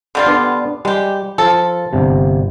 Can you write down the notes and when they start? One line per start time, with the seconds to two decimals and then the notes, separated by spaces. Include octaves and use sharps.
0.15 D3 G3 F4
0.26 B3 D4
0.85 G3 G#3 G4
1.38 F3 F4 A4
1.93 G1 C3